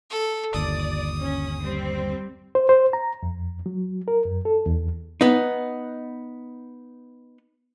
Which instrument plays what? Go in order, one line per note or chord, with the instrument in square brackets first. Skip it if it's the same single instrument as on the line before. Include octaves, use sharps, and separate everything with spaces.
[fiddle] A4
[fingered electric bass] G1 D#2 [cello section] D5 [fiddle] D#6
[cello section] C#4
G3 C4
[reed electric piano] C5
C5
A#5
F2
F#3
A#4
F#2
A4
E2
[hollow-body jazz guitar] B3 D#4